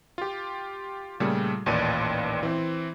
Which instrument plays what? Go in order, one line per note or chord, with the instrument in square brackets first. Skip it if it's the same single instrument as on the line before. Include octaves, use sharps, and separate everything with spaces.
[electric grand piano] F4 G4
A#2 C#3 G3 A3
A1 D#2 A#2 B4 D5 D#7
E3 C4